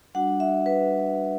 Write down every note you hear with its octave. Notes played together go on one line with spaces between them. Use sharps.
G3 D4 F#4 F#5
E5
B4